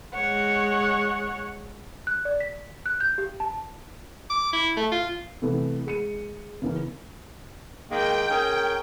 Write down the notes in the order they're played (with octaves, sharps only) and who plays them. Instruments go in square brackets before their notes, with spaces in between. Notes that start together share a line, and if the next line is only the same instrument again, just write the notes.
[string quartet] G#3 C#5 F#5
[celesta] F#6
D5
B6
F#6
G6
G4
A5
[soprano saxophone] D6
E4
A3
F4
[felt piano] C3 E3 A3 B3
G#3 C#7 D#7
C#3 E3 A#3 B3 C#4
[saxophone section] D#3 G#3 A#3 [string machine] G5
[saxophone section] C#4 G#4 A#4